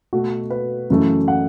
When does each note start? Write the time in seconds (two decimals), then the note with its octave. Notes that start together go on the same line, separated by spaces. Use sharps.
0.13 B2 A3 F#4
0.50 B4
0.90 F#2 C#3 E3 A3
1.28 F#5